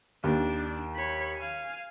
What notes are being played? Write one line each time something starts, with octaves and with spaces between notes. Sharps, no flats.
D#2 D4
C#5 B5
F5 G#5